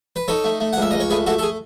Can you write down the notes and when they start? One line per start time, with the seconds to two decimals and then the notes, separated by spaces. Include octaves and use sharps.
0.16 B4
0.28 D#4 A4 C#5
0.44 A3
0.60 A3
0.73 F#5
0.77 C#2 E5
0.91 C#2 D#5
1.00 C#5
1.10 A3 G#4 B4
1.26 A3 F#4 A4
1.39 A4
1.43 G#4